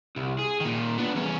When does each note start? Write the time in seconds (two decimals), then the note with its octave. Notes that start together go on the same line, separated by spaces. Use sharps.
0.17 C2
0.39 G#4
0.60 A#2 D#3
0.98 B3 D4
1.15 E2 C#4